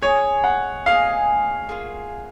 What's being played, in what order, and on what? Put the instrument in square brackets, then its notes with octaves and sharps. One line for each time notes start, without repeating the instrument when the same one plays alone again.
[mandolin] D#4 G#4 D#5 G#5 [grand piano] C#5
[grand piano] F#5
[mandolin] D#4 G#4 D#5 G#5 [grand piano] F5
[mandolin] A#3 F4 G#4